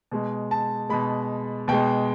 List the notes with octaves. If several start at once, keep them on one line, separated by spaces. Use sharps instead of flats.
B2 G#3
A5
B2 G#3 B5
B2 G#3 G5